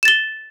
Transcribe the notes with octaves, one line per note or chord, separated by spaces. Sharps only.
A6 E7 G7